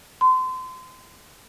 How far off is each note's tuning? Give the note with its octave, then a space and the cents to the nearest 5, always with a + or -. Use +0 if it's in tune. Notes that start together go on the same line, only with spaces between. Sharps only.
C6 -30